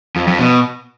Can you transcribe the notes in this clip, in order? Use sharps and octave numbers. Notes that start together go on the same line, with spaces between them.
F2
F2
B2